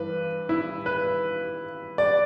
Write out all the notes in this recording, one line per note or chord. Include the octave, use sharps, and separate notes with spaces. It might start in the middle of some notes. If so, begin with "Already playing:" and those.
Already playing: G2 E3 B4
E4
B4
D5